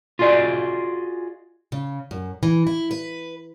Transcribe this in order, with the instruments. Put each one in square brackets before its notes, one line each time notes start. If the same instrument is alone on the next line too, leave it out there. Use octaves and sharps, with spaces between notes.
[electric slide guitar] F4 F#4 G#4 D5 D#5
[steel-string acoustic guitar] C#3
F#2
E3
E4
B4